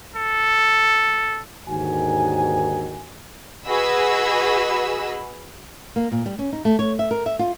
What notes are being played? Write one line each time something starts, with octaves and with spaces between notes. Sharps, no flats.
A4
D#2 G#2 D3 D#3 F#4 G#5
F#4 G#4 B4 D#5 B5 E6
A#3
A#2
G3
C#4
D#4
A3
C#5
E5
A#4
E5
F4